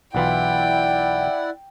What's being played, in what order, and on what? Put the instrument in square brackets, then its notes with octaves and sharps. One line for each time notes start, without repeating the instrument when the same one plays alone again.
[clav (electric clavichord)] B1 E3 F4 [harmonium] E4 D5 F#5 [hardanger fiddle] G5